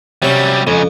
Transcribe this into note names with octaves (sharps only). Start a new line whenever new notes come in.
C3 F#3 G3 C#4
F2 C#3 G#3